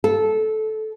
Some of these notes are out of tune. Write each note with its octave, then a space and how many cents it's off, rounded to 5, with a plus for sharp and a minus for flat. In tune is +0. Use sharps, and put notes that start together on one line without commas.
A4 -15